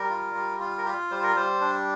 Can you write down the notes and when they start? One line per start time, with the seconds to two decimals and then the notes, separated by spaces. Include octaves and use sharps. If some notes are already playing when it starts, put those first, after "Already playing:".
Already playing: G3 A#4
0.10 F4
0.35 G3
0.61 F4
0.78 A#4
0.85 F4 G4
1.11 G3 C5
1.23 A#4
1.36 G3 C5
1.61 D4